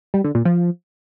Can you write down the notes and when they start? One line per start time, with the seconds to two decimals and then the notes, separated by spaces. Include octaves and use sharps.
0.14 G3
0.24 D3
0.35 A#2
0.45 F3